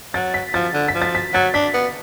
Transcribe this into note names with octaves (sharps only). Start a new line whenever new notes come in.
F#3 A6
B6
F3 A6
D3
B6
F3
A6
B6
F#3 A6
D4 B6
B3